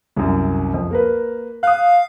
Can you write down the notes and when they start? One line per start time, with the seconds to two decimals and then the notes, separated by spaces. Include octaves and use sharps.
0.17 C2 F#2
0.74 F2
0.91 A#3 A#4 B4
1.63 F5 D#6 F#6